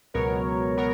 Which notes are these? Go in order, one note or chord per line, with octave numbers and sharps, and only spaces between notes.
C#2 B2 F#3 B3 A#4 C#5
B2 F#3 B3 A#4 C#5